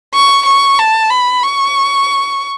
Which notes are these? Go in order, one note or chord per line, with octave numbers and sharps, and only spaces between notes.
C#6
C#6
A5
B5
C#6